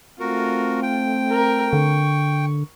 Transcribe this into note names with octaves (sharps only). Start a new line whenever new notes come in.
A3 C4 F4 F#4 A#4
G5
A#4
D3 C#6